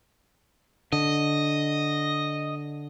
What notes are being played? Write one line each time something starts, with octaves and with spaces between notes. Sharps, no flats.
D3 D#5